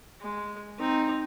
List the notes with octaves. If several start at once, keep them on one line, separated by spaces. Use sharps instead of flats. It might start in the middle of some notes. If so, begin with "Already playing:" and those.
G#3
C4 D#4